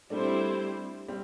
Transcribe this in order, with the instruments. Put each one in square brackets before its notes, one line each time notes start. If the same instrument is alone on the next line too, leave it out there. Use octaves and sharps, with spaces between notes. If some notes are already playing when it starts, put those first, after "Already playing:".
[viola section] G3 C4 E4 C5 [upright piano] A3 D4
[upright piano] G3 C4